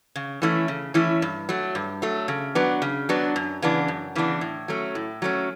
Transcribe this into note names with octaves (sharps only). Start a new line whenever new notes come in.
C#3
E3 A3 C#4 E4
C#3
E3 A3 C#4 E4
G2
F#3 A3
G2
F#3 A3
C#3
F#3 B3 D4
C#3
F#3 B3 D4
F#2
C#3 E3 B3 D4
F#2
C#3 E3 B3 D4
A2
F#3 A3 C#4
A2
F#3 A3 C#4